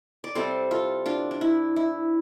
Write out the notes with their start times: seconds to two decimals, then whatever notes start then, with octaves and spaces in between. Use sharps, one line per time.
0.24 D5
0.35 C3 G3 C4 A4 C5
0.71 F4 A4
1.06 D4 F4
1.31 D4
1.41 E4
1.76 E4